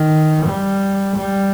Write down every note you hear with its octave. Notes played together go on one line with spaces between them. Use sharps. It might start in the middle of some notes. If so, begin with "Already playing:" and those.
Already playing: D#3
G3
G3